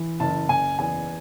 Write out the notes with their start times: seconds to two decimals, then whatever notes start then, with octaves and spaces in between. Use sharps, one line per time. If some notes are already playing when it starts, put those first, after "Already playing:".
Already playing: E3
0.20 F#1 A5
0.49 F#1 G#5
0.79 E2 G#5